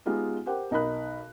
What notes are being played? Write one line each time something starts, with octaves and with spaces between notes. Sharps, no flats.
G#3 B3 D#4 F4 G4
G4 A#4 C5 F#5 G5
B1 D#4 A#4 D#5 B5 F#6